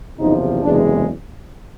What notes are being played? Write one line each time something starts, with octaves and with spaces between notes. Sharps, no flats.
F#1 E2 C3 F3 D#4
F#1 E2 C3 E3 G#3 D4